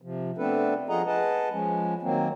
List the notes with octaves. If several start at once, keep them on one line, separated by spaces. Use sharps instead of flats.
C3 F3
A3 B3 C4 D4 A4 B4
F3 F4 G#4 D#5 F#5 A#5
G#4 B4 D#5 F#5 A5
F3 G#3 C#4
D#3 F#3 A#3 C4